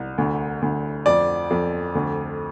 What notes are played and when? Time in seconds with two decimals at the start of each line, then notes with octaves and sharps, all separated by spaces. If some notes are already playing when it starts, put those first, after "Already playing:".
Already playing: C2
0.18 D2
0.62 D2
1.06 F2 D5
1.51 F2
1.95 D2